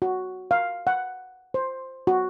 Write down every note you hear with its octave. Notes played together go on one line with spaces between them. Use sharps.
F#4
F5
F#5
C5
F#4